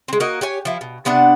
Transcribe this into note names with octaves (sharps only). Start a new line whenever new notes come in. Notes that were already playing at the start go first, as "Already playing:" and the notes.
G#3 C4
A#3 F#4 A#4 D#5
G4 C#5 G#5
F3 E4
B2
C3 B3 D4 F#5